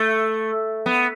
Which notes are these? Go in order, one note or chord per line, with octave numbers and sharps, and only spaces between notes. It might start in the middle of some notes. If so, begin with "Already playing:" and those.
Already playing: A3
B3